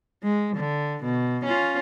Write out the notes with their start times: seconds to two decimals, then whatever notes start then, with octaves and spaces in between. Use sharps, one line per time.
0.23 G#3
0.56 D3
1.04 B2
1.45 C#4 F4